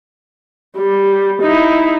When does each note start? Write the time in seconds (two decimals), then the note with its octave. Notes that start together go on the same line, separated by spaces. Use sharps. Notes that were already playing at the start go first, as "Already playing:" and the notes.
0.77 G3
1.42 D#4 E4